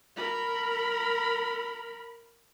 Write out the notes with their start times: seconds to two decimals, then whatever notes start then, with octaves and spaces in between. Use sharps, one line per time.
0.17 A#4 B5